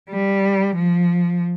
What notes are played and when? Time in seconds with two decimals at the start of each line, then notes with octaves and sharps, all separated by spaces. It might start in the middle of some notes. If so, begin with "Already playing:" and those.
0.10 G3
0.75 F3